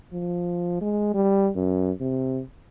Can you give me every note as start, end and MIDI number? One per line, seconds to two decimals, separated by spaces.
0.13 0.81 53
0.82 1.14 56
1.14 1.51 55
1.56 1.92 42
2.01 2.42 48